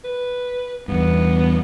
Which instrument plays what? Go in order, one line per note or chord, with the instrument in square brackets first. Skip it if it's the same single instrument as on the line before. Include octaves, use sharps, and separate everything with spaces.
[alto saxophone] B4
[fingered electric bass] E2 G2 [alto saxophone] B3